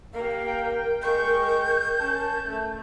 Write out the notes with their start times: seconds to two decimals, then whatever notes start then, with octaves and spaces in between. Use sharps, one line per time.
0.14 A#3 G4 A#4 F5
0.47 G5
1.02 G#3 C#6 G6
2.00 C#4 A5
2.47 A3